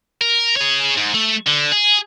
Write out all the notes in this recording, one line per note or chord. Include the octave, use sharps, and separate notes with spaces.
A#4
G#4 C#5
G#2
A3
D3
G#4